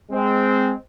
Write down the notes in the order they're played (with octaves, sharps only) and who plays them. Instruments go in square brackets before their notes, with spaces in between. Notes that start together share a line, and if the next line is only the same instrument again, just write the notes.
[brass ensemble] G#3 C4